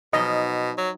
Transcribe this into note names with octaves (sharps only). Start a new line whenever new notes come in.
B2 F3 F#3 D#4 D#5
F#3